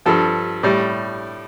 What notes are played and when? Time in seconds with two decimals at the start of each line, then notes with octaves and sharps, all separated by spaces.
0.06 G2 F3 A4
0.63 A2 G3